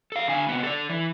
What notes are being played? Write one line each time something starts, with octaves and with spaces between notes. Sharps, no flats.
A4 F5
D3 G#5
C3 B3
A4 D5
E3